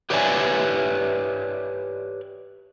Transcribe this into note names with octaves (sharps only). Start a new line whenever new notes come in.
G4 B4 C#5 D5 E5 G#5